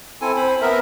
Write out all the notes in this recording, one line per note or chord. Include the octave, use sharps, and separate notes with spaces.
C4 E4 A4 G#5
C4 C5 B5
B3 A#4 E5